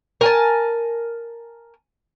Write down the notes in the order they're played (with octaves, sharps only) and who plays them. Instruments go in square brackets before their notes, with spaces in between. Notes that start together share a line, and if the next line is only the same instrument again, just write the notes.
[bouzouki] A#4 G#5 A5